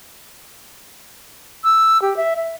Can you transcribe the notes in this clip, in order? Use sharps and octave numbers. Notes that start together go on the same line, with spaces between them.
E6
G4
E5
E5